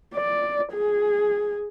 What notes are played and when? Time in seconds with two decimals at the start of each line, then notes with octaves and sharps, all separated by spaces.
0.15 D5
0.73 G#4